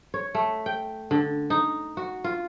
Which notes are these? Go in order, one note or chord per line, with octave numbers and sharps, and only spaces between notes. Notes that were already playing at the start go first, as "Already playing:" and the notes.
C#5
A3
G5
D3
D#4
F#4
F4